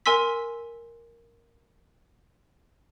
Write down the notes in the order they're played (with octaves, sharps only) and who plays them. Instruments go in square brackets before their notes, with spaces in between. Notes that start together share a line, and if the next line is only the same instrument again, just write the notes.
[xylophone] A#4 G#5 C6 E6 B6